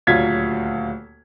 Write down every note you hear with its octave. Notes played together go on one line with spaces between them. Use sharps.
D#1 D2 F#3 F4 G#6 B6